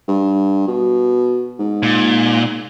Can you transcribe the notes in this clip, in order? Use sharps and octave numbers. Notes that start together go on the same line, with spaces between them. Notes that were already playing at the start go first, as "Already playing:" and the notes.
G2
B2
G#2
A#2